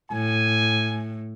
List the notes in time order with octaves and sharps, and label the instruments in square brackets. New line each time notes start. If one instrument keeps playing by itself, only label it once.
[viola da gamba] A2 [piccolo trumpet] G#5